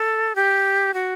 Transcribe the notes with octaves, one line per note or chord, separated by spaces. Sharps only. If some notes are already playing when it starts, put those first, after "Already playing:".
Already playing: A4
G4
F#4